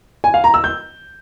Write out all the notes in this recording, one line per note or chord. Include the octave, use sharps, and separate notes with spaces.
G#5
F5
A#5
E6
G6